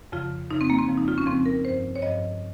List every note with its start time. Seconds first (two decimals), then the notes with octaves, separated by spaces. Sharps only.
0.12 F2 C#3 F3 F4
0.50 F2 C#3 F3 D#4
0.61 C4
0.70 A#3
0.79 C4
0.88 F2 C#3 F3
0.98 D#4
1.08 F4
1.18 C#4
1.26 F2 C#3 F3 C4
1.46 A#4
1.64 G2 F3 C5
1.95 C#5
2.02 G2 F3 D#5